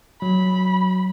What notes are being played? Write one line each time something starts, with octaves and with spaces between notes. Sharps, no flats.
F#3 B5